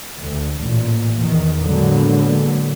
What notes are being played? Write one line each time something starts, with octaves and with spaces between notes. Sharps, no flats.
D2
A1 A#2
E2 D#3
A2 D3 F#3 G#3 A#3 B3